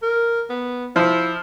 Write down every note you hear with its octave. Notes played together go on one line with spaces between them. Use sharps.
A#4
B3
F3 E4